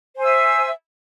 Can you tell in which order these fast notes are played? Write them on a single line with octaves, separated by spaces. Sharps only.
C5 G#5 E6 E5